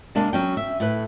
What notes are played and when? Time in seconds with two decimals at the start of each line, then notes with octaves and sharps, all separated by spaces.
0.15 C3 G#3 A#3 D4
0.33 F#3 C#4 G5
0.57 E5
0.80 A2 B4